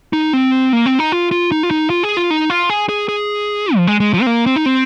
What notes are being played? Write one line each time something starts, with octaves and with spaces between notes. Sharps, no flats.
D#4
C4
A#3
C4
D#4
F4
F4
D#4
F4
D#4
F4
G#4
F4
D#4
F4
G#4
G#4
G#4
F3
G#3
G#3
F3
C4
A#3
C4
D#4
C4